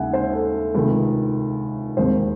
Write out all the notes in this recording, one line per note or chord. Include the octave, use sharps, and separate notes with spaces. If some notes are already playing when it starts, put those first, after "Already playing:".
Already playing: D#2 C#3 G#3 E5 F#5 G#5
C5
A4
A4
C#2 C3 D#3 A3
E1 D#2 D#3 G#3 C4 C5